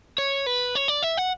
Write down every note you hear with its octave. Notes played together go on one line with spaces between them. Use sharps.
C#5
B4
C#5
D5
E5
F#5